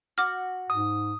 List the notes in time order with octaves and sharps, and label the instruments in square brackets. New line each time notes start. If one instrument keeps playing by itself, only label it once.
[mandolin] F#4 [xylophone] D6 F6
[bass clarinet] G#2 [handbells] D#6